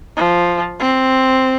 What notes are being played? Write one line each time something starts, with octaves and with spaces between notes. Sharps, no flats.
F3
C4